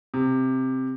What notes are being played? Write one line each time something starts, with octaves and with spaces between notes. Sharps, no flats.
C3